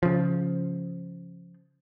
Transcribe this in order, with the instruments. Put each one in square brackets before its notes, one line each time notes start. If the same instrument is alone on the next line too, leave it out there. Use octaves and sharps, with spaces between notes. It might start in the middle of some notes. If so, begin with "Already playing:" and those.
[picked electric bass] C#3 F3